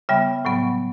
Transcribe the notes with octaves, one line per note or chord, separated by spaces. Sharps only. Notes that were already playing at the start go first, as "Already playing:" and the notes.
C#3 G3 B3 E5 G5
A2 F#3 B3